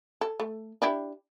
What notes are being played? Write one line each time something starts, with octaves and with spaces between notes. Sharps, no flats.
A4
A3
D4 E4 G4